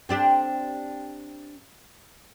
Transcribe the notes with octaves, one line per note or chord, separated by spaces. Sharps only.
C4 D4 G4